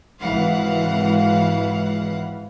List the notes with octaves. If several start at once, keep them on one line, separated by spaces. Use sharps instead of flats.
G#1 C#2 E3 F5 F#5